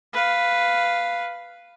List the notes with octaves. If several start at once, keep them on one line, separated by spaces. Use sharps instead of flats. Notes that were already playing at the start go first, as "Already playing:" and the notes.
B4 F5